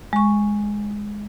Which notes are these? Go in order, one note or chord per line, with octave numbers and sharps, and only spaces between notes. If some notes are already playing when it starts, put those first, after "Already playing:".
G#3 C#6